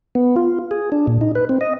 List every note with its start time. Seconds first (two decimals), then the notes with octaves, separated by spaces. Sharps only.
0.15 B3
0.36 F4
0.71 G#4
0.92 D4
1.07 A#2
1.21 D#4
1.35 B4
1.49 C4
1.61 D#5